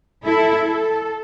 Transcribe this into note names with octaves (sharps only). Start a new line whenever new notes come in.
E4 A4
A4